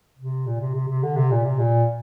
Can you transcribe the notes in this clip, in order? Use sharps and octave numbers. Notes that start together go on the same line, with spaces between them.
C3
A#2
C3
C3
C3
D3
C3
A#2
C3
A#2